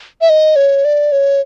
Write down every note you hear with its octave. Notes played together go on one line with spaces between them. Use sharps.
E5
D#5
C#5
D5
C#5